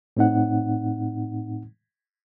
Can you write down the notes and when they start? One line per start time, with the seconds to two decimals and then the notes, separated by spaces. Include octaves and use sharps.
0.17 A2 C4 D#4 F#5